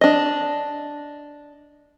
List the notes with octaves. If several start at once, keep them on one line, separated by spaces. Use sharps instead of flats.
D4 D#5